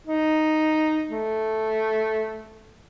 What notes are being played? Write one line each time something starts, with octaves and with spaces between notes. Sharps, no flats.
D#4
A3